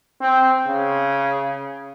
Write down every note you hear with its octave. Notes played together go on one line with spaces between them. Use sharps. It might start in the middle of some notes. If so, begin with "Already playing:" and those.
C4
C#3